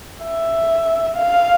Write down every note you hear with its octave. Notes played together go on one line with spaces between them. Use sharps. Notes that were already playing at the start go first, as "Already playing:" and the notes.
E5
F5